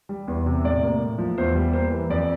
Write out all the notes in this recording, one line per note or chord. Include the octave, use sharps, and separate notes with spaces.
G3
E2
C3
A2 D5
A#3
A2
F3
E2 C5
G3
A#3 C5
E3
F2 D5